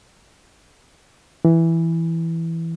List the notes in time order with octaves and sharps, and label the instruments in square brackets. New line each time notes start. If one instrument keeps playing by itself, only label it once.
[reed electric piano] E3